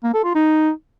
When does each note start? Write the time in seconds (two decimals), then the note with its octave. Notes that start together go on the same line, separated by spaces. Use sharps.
0.04 A#3
0.14 A4
0.24 F4
0.35 D#4